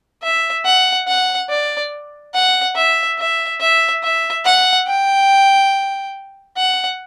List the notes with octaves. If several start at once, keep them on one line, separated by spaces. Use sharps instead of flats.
E5
F#5
F#5
D5
F#5
E5
E5
E5
E5
F#5
G5
F#5